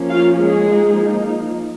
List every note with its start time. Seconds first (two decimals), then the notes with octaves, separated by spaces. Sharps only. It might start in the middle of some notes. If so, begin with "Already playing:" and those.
Already playing: F3 A#3 C#4
0.10 F4 F5
0.38 G#3 G#4
0.68 F3 A#3 D#4